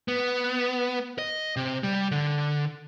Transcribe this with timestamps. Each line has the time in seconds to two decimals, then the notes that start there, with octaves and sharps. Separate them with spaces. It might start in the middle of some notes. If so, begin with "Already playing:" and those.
0.08 B3
1.18 D#5
1.56 C3
1.83 G3
2.11 D3